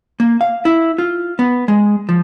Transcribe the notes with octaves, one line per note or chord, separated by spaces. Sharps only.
A#3
F5
E4
F4
B3
G#3
F3